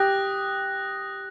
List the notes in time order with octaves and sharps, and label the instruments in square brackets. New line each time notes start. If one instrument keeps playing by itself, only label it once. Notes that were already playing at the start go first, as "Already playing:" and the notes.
Already playing: [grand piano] G4 [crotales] D#6 F#6 A#6